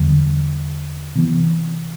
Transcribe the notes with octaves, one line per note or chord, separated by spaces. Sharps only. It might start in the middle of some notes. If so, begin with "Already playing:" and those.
Already playing: E2 D3 G3
C3 E3 B3